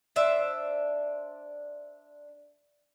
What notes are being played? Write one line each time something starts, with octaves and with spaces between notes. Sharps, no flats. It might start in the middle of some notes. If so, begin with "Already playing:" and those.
D4 C5 E5